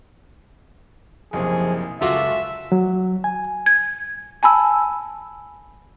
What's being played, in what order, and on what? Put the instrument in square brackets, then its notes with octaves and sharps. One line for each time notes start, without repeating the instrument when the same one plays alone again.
[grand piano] F#1 B1 C3 [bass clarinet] F3 [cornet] G#4
[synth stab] C#2 F4 F#4 [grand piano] F#2 A4 D6 [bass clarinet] C#3 [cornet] E5
[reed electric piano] F#3
G#5
[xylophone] G#6
G#5 A5 B5 E6